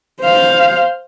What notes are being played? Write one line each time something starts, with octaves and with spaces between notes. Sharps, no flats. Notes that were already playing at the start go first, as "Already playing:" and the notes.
C5 F5